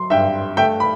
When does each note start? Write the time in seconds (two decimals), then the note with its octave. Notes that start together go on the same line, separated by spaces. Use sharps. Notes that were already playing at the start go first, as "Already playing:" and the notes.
Already playing: F#3 C6
0.10 G2 E5 G5
0.57 A3 E5 G5
0.80 B5